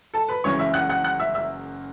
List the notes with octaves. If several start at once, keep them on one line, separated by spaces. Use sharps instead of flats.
A4 A5
B4 B5
F#1 F#2 C#3 E3 G#3 C#5 C#6
E5 E6
F#5 F#6
F#5 F#6
F#5 F#6
E5 E6
E5 E6